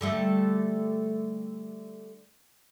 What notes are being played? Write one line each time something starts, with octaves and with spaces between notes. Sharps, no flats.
D3 G3 A3